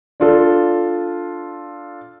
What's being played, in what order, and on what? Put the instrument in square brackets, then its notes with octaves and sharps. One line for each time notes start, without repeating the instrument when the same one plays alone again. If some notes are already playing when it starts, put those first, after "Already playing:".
[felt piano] D4 F4 A4